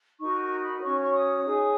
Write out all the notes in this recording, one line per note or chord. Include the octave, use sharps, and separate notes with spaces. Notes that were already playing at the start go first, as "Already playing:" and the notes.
D#4 F#4 A#4 C#6
C#6
B5
C#4 F#4 C#5 C#6
C#6
D#6
D#4 G#4 C#5